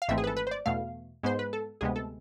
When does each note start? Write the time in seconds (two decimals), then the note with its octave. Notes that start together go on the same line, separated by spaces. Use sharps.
0.02 F5
0.08 G#1 G#2 E3 A3 C4 E5
0.18 G#4
0.24 B4
0.27 A4
0.37 B4
0.47 C5
0.51 D5
0.66 E2 B2 A3 F5
1.23 G#2 G#3 B3 C5
1.39 B4
1.53 A4
1.81 D2 C3 G#3 B3 G#4
1.96 A4